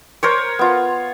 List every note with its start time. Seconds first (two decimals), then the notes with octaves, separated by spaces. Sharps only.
0.23 A#4 C5 C#5
0.59 B3 F4